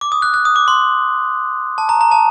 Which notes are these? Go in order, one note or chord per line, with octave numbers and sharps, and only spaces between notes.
D6
D#6
F#6
F#6
D#6
D6
C6
A5
A#5
A#5
A5